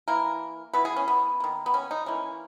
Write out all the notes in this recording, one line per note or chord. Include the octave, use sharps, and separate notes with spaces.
E3 A#3 A#4
E3 B3 B4
G#4
C#4
B3
D#3 A#3
B3
C#4
D#4
E3 A#3 C#4